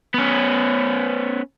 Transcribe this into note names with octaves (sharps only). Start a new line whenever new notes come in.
B3 C#4